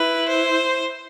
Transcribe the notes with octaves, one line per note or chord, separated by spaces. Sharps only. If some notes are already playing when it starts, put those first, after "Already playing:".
Already playing: E4 B4
C5